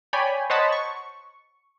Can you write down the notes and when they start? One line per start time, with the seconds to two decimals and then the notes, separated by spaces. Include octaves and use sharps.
0.13 C#5 D5 G5 G#5 B5
0.50 C5 C#5 D#5 F#5 A5 B5
0.72 C#6